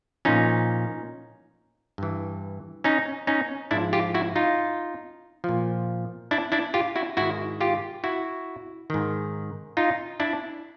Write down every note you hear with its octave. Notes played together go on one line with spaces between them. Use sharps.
A#2 F3 C#4 D#4
G2 E3
C#4 D#4
C#4 D#4
G#2 F3 D4 E4
F4 G4
E4 F#4
D#4 F4
A#2 F3
D4 E4
D4 E4
F4 G4
E4 F#4
G#2 D#3 E4 F#4
F4 G4
E4 F#4
G#2 D#3
D#4 F4
D4 E4